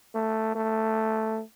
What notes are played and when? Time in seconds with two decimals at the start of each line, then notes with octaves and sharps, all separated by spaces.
0.14 A3
0.55 A3